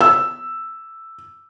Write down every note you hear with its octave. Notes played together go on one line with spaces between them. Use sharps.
E6